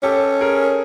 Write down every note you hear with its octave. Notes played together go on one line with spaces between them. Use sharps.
C#4 G4 A4
G#4 A#4